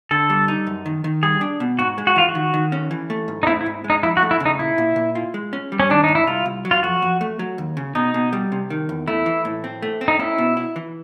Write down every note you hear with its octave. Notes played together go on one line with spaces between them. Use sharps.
D3 A4
G3
D#4
F#2
D#3
D#3
G3 G#4
D4
B2
G#2 F#4
G#3
F#4
E3 F4
F#4
D#3
D#3
C#4
E3
A3
G#2
D#4
C4 E4
E4
G#2
G#3
D#4
F2 E4
F#4
A3
E4
C#3
D#4
A#2 E4
A#2
A#2
F4
G#3
C#4
G3
C#4
D#3 D4
G#2 D#4
E4
C2 F4
C2
F#3
F4
F2 F#4
F2
A3
F#3
D#2
C#3
B2 D#4
B2
G3
C3
D#3
E2
A3 E4
E3
A2
C4
A3
C4
D#4
C#4 E4
B2
E4
E3